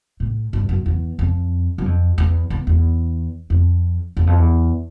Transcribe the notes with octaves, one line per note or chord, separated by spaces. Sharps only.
A2
G2
F#2
E2
F2
F#2
F2
E2
E2
E2
F2
E2
F2
E2